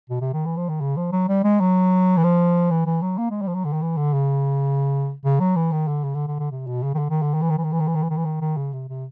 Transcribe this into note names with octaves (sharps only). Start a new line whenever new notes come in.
B2
C3
D#3
E3
F3
D#3
C#3
F3
F#3
G3
G#3
F#3
E3
F3
E3
E3
F#3
A#3
G#3
G3
F3
F#3
D3
D#3
E3
D3
C#3
C#3
F#3
E3
D#3
D3
C#3
D3
D3
D3
C3
B2
C#3
D#3
D3
D#3
D3
D#3
E3
D#3
E3
D#3
E3
D#3
E3
D#3
E3
D#3
E3
D#3
D#3
C#3
C3
C3